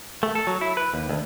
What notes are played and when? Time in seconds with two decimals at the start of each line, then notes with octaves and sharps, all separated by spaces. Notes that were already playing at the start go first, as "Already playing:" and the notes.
0.23 A3
0.35 A4
0.47 F#3
0.61 E4
0.77 B4
0.94 D#2
1.09 D2